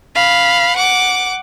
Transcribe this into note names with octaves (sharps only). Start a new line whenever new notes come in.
F5 B5
F#5 D6